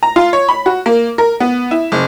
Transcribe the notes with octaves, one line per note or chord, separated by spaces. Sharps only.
A#5
F4
C#5
B5
F#4
A#3
A#4
B3
E4
F#1